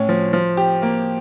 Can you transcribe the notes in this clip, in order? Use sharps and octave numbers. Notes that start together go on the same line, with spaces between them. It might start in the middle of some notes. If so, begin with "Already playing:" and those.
Already playing: A2 C#4
F3
F3
G4
A#3